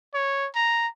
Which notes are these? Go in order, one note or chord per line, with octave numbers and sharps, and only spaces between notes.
C#5
A#5